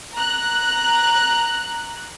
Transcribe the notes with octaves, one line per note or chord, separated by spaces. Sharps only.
A#5 F#6